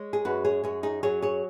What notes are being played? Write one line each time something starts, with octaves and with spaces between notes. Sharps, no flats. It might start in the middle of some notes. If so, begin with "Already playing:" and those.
Already playing: G#3 C#5
G#4
F#2 F#4 B4
G#4 C#5
F#2 G#4 C#5
D#4 G#4
F#3 G#4 C#5
G#4 C#5